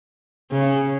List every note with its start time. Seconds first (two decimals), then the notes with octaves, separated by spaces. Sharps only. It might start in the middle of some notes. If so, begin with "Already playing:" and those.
0.52 C#3